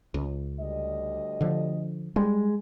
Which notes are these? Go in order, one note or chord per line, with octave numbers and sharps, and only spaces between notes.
C#2
D2 G3 D#5
D3 F3
G3 G#3